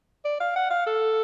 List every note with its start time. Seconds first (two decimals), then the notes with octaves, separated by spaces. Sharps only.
0.25 D5
0.40 F5
0.56 F#5
0.70 F5
0.86 A4